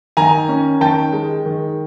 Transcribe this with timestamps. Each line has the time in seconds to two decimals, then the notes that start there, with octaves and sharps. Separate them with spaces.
0.17 D#3 G#5 A#5
0.48 C#4
0.81 D#3 G5 A5
1.13 G#3
1.46 D#3